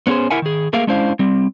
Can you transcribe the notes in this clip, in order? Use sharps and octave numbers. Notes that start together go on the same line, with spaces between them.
B3 C#4 E4 G#4 C5
E4 A#4 E5 F#5 G#5
D#3 G#4
A3 A#3 G#4 A#4 E5 F5
G#3 C#4 D4 E4 C5 F5
G3 C4